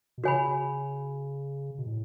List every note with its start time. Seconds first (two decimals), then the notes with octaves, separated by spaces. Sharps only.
0.18 B2
0.24 C#3 F#4 C#5 G#5 B5
1.78 B2
1.87 A2